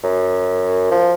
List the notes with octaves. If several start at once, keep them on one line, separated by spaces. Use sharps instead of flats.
F#2
F3